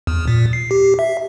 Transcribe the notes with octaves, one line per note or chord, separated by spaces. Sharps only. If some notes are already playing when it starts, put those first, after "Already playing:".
E2
A#2
C7
G4
E5